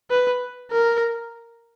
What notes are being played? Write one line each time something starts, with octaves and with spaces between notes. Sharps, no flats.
B4
A#4